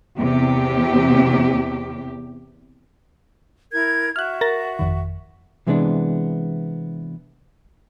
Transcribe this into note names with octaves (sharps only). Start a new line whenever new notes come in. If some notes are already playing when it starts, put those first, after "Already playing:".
E2 C3 G4
E4 A#4 G#6
F#4 E5 F6 F#6
A#4 A6 A#6
G1 F2 D#3
C3 E3 G#3 B3 C4 D4